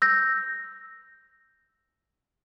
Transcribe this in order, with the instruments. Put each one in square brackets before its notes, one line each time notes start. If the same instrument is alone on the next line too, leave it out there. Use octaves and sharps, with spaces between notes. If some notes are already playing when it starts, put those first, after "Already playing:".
[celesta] E6 G6 A#6